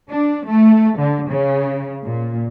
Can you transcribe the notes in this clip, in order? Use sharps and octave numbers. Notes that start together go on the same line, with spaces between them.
D4
A3
D3
C#3
A#2